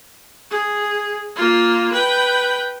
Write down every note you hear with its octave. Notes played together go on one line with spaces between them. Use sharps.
G#4
A#3 F4
B4 G5